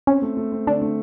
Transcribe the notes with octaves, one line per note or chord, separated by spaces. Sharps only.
C4 C#4
A3
A3
C4
D3 D4
A3